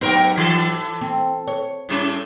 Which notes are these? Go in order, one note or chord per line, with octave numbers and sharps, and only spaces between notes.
G#2 F#3 B3 G4 A#4
E3 A4
C4
C#5
A2 G3 C#4